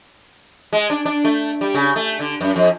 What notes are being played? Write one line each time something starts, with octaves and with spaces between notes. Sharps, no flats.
G#3
D4
D4
A3
G3
C#3
A3
D3
F#2
F2